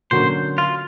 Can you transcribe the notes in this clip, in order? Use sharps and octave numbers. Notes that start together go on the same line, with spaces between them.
D3 F#3 A#3 C#4 F#4 C5
F4